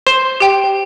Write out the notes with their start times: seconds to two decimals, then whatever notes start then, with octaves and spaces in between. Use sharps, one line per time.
0.07 C5
0.40 G4 G5